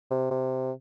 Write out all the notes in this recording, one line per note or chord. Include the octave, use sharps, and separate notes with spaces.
C3
C3